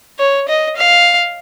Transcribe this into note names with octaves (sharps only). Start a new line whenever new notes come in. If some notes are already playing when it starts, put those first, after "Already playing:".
C#5
D#5
F5